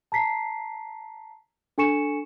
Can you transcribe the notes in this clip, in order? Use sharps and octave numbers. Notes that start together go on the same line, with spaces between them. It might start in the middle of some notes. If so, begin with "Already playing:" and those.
A5 A#5 B6 C7
D4 A4 G#5 C#6 C#7 E7